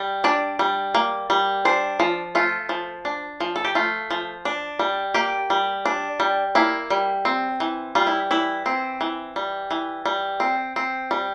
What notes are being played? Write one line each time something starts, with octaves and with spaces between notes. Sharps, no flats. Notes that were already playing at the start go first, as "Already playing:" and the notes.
Already playing: G3
D4 D5
G3
A#3
G3
D4 C5
F3
A3 F4
F3
D4
F3
A4
G4
A3 F4
F3
D4
G3
A#3 G4
G3
D4
G3
A#3 E4
G3
C4
E3
G3 F4
E4
E3 E4
C4
E3
G3
E3
G3
C4
C4
G3